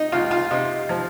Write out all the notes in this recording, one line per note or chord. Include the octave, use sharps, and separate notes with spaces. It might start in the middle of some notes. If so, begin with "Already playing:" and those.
Already playing: D#4
C#2 F4
F4
C3 D#4
F3